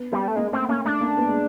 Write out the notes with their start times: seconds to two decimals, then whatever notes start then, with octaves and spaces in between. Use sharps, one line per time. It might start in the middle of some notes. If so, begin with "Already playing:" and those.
Already playing: B3
0.12 G3 B3
0.28 A3
0.36 G#3 A#3
0.52 A3 C4
0.69 A#3 C#4
0.85 A3 D4
1.01 A#3
1.17 B3
1.27 G#3